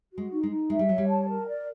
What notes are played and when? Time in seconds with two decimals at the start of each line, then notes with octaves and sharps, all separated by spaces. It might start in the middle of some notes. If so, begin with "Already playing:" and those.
0.12 F#4
0.18 G#3
0.31 D#4
0.43 G#3
0.51 D#4
0.70 G#3 E5
0.79 G3
0.89 F#3 C#5
0.98 G3
1.08 A5
1.28 A#4
1.48 D5